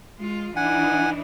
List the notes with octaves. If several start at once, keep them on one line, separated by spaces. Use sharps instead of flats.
G#3 F4
E3 D4 D#4 F#5 G#5